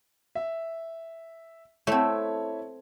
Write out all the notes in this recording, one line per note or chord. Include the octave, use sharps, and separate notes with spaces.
E5
A3 C4 E4 C#5 E5